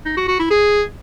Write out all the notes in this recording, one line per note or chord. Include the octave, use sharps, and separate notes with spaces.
D#4
F#4
F#4
E4
G#4